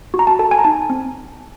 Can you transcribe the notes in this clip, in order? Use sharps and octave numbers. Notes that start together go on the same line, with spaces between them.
F#4
A#5
A5
A4 A5
G#5
A#5
D#4 A5
C4